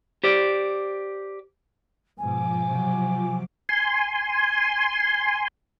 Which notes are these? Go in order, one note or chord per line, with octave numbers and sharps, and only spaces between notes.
G4 C5 D5
G#2 B2 F3 G#5 D6
C3 F#3
G#5 C6